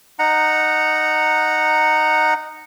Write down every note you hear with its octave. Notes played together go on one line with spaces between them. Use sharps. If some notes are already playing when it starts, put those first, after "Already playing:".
D#4 F#5 A#5